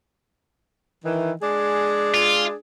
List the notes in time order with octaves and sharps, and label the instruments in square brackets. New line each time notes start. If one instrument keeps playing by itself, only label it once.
[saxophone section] D#3 E3
G#3 D4 G#4
[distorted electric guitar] F4